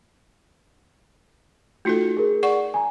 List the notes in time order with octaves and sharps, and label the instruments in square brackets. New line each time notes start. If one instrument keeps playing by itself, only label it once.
[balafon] A3 D#4 A4 [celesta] F4 F#4 C#7
[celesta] G#4 A#4
[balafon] D5 F#5 C#6
[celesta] G#5 A#5